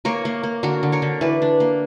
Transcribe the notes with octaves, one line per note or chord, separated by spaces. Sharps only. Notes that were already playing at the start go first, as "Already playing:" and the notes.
A#3 A#4 C#5
A#3
A#3
D3 F#4 A#4
D3
A#4 C#5
D3
E3 B4 D5
D4
A#3